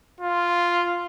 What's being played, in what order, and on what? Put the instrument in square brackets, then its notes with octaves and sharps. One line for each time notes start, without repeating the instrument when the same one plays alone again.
[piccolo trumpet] F4